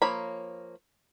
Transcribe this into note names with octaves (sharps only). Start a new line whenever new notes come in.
F3 A#3 C#5 A#5 B5